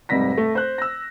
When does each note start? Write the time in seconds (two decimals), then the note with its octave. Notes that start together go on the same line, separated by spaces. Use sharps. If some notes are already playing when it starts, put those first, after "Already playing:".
0.09 F1 G#2 C3 G3 A#6 B6
0.38 A3
0.55 C5 F#6
0.78 E6 A#6